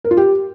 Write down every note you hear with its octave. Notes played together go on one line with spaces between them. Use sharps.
A#4
F4
G4